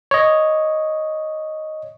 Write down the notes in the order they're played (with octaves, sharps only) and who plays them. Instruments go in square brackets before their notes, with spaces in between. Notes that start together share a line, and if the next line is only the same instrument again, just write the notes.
[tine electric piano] C#5 D#5